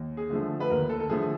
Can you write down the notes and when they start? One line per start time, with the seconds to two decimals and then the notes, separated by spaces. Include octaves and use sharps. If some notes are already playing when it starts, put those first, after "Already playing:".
Already playing: D#2
0.17 G#4
0.30 D3 F3 A3
0.60 B4
0.70 D#2 A#4
0.89 A4
1.00 A4
1.09 D3 F3 A3 G#4